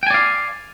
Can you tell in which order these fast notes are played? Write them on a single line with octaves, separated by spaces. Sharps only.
G5 G#5 D5 F5